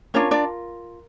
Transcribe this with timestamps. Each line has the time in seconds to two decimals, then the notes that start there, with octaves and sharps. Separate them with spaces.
0.14 C#4 D4 F4 A#4 C#5
0.31 D4 D5